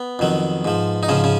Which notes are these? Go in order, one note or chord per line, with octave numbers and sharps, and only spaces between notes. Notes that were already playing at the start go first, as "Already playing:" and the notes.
Already playing: B3
F2 D#3 F#3
G#2 F3
D#4
G#2 C#3 F3 C#4
C#3 C#4